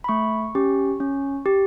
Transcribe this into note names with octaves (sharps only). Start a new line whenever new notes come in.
B5
A3 C#6
C#4 G4
C#4
G4